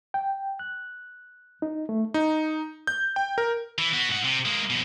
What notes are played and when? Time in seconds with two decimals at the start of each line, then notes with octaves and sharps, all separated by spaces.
0.14 G5
0.59 F#6
1.62 D#4
1.89 A3
2.14 D#4
2.87 G6
3.16 G5
3.38 A#4
3.78 E3
3.93 B3 F#4
4.09 G#2 F#5
4.24 C3
4.45 G#3 A#3
4.70 F2 B2